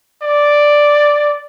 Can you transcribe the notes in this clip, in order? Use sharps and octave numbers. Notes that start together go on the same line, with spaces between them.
D5